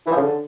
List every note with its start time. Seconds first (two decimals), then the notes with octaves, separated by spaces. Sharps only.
0.06 E3
0.11 F3
0.16 C#3
0.21 D3